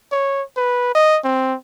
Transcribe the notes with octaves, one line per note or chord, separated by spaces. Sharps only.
C#5
B4
D#5
C4